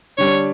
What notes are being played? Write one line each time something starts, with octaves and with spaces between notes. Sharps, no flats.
D3 G3 D4 C#5